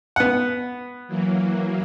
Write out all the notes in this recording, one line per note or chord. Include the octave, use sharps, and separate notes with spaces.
B3 F#5
E3 F#3 A#3